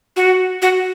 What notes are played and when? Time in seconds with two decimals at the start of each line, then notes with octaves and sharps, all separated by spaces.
0.16 F#4
0.62 F#4